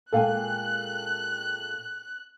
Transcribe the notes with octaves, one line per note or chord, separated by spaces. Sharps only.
A#2 G#3 A4 F5 G5 G#5 F#6